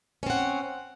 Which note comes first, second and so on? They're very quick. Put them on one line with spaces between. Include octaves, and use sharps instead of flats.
C#4 C4 F#5